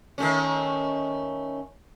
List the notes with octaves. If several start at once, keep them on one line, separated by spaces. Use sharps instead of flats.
D#3 A3 C#4